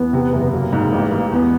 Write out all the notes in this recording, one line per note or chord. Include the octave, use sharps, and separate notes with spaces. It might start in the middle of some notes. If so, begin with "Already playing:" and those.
Already playing: E2 B3
C3
F#1
F#3 A#3
G#2
A1
A1
E2 B3